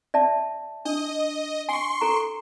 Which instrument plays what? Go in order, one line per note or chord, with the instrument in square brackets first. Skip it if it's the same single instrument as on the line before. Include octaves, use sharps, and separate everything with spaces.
[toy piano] D5 E5 A5
[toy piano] D4 [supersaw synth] D#5
[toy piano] G#5 [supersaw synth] C6 C#6
[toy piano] A4 A#5